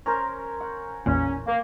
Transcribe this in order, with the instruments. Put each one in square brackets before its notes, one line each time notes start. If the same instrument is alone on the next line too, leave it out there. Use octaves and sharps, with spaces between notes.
[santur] C#4 A#4 C5 [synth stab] A#5
[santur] F#5
[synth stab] A1 E2 A#2 [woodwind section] C#4
[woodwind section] A#3